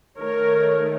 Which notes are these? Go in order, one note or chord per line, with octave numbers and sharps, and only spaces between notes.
D#3 A3 A#4 C#5